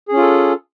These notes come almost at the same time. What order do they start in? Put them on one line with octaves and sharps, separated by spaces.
G#4 C#4 F4 A4